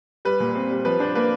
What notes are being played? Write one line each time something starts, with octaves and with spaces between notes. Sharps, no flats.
G3 B4
A#2
C4
G3
F3 B4
D4 C5
A#3 B4